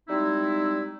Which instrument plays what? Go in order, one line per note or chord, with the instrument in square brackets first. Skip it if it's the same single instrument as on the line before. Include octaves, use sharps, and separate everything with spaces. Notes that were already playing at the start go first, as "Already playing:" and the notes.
[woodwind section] G3 G#3 C4 D#4 E4